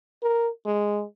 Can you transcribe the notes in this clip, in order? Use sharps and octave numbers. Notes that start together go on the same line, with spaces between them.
A#4
G#3